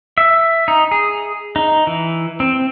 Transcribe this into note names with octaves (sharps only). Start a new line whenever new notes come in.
E5
D#4
G#4
D#4
E3
C4